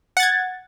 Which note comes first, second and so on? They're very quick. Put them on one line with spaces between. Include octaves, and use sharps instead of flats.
F#5 A6 G#6